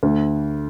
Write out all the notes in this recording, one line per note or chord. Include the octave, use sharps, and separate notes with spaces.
D2